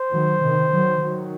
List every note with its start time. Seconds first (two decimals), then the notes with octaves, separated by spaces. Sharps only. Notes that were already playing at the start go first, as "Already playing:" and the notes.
Already playing: C5
0.13 D#3 F#3
0.43 C3 D#3
0.74 D#3 F#3
1.04 D#3 F#3